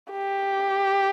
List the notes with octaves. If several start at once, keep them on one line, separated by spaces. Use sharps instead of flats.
G4